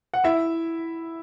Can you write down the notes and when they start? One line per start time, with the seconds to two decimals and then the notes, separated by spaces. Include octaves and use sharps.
0.14 F#5
0.24 E4 E5